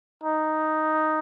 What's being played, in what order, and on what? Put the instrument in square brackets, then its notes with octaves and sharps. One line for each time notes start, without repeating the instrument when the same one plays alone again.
[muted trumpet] D#4